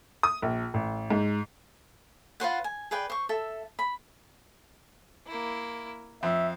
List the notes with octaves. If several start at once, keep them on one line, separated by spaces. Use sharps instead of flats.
D#6
A#1
A1
G#2
F4 B4 C5 F#5
G#5
G#4 B4 D5 G5
C5 C#6
A4 E5
B5
A#3 E4
F2 E5 F5